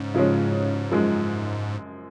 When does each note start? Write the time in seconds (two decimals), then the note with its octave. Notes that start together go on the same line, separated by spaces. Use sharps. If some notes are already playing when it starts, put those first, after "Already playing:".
Already playing: G#2 C#3
0.14 C#3 F3 G#3 C#4
0.91 F#2 F3 G#3